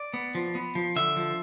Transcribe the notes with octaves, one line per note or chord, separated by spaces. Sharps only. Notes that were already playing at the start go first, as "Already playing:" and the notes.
Already playing: D5
B3
F3
B3
F3
D3 E5
F3